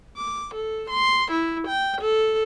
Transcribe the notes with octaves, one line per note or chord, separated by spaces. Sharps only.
D6
A4
C6
E4
G5
A4